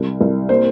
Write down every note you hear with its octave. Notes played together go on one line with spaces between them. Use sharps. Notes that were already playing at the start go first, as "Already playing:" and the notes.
Already playing: C2
C2
A#3 C5